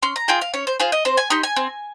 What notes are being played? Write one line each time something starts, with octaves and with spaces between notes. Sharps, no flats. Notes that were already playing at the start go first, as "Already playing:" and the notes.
C#4 C6
A#5
F4 G#4 G5
F5
C#4 C#5
C5
F4 G#4 C5
D#5
C4 C5
G#5
D#4 G4 C6
G#5
C4